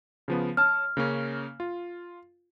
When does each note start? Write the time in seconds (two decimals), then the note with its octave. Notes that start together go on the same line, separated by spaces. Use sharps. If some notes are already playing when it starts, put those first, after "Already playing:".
0.28 C#3 F3 B3
0.57 C#5 A5 F6
0.97 C#3 A#3 C#4
1.60 F4